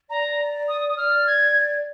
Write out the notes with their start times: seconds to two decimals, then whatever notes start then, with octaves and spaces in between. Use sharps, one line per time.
0.10 D5 A#5
0.68 D#6
0.89 D#6
0.97 D5 F6
1.27 G#6